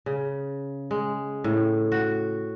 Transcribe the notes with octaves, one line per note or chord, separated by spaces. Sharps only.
C#3
G#3
A2
F#4